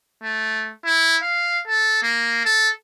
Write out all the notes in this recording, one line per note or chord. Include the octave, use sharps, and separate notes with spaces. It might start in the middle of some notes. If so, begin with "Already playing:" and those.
A3
E4
F5
A4
A#3
A4